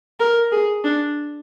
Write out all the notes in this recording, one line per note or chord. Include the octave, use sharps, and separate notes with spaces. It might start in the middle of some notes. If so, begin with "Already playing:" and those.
A#4
G#4
D4